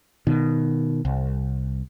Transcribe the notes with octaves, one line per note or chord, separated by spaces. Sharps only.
B2 D#3
C2